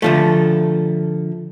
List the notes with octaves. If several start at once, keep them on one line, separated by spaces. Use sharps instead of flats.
D3 F3 A3